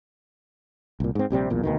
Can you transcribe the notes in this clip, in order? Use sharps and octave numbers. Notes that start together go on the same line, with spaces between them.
C2 A#2
G#2 C4
A#1 C3 G3 C4
B1 E2 A#2
D2 B2 D#3